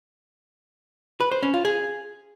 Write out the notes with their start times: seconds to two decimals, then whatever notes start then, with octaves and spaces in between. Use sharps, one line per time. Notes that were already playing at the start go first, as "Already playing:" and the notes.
1.20 B4
1.31 C5
1.43 C#4
1.54 F4
1.65 G#4